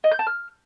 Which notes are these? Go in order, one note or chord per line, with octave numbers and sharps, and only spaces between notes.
D#5
G6
A5
F6